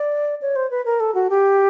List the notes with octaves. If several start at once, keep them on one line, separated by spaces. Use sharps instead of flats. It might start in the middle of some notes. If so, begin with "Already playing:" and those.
Already playing: D5
C#5
C5
B4
A#4
A4
F#4
G4